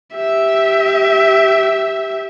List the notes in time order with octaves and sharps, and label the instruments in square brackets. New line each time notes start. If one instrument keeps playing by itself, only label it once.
[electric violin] G4 E5